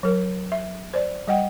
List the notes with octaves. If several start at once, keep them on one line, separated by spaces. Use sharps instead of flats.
F#3 A#4
E5
C5 D5
G3 D#5 F#5 G5